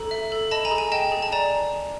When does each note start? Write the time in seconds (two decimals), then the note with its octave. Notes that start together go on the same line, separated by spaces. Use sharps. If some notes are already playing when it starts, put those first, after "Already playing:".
Already playing: A4 A#5
0.11 E5
0.32 A4
0.51 D#5 A5 B5
0.65 G#5 A#5
0.71 G#4
0.78 G#5
0.92 D#5 G5 A5
1.12 G#4
1.22 A5
1.32 D5 G#5 A#5